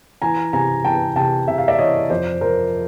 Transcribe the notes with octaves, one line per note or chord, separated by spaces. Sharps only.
E3 G#5 A#5
C3 G#5 A#5
E3 G5 A5
C3 G5 A5
C3 E5
F5
D5 E5
E3 C#5 D#5
F2 C5 D5
F3 A#4 C5